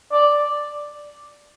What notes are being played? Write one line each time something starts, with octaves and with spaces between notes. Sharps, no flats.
D5